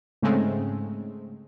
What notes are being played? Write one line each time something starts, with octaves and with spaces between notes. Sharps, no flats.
G#2 C#3 G#3 A3 C4